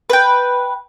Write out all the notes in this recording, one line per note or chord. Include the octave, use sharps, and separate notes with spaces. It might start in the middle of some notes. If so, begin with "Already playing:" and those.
B4 G5